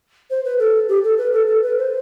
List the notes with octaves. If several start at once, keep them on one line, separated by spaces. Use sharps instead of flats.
C5
B4
A4
G4
A4
B4
A4
A4
B4
C5